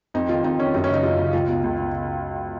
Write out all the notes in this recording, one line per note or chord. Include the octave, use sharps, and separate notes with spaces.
F2 D#4
D#3 F4
F2 D#4
D#3 C#4
F#2 D#4
C#4
C#3 D#4
F#2 F4
C#3
C#2 F4
B2
C#2
B2